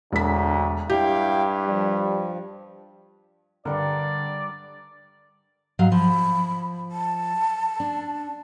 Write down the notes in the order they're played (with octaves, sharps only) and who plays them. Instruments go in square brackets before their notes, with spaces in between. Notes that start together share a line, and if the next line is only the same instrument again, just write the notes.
[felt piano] E1 B6 [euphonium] D2
[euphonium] G2 [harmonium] E4 F5 G5 [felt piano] G4
[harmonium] F3 [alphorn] G3
[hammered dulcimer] G2 G3 A#4 [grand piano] D3 [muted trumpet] D5
[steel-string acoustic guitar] G#2 F#3 F5
[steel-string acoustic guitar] F3 [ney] B5
[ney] A5
[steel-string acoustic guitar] D4